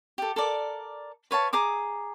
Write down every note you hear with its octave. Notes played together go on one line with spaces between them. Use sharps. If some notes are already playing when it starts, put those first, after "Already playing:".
G4 A4
A4 A#4 D5 D6
B4 C#5 F5 A5
G#4 A#5 D6 D#6